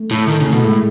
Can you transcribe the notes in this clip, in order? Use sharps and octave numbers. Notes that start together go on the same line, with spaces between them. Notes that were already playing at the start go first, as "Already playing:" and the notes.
Already playing: A3
A2 E4
D#3 A4
C#3
A3
B2
A2 G#3